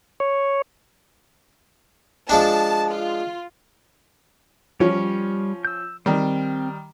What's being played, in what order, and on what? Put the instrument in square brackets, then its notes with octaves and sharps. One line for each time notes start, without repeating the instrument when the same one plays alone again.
[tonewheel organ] C#5
[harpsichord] F3 G#3 D4 [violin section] A5
[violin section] F4
[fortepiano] F3 C#4 [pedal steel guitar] G3 C#5
[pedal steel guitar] E6 G6
[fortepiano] D#3 G3 [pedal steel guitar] C4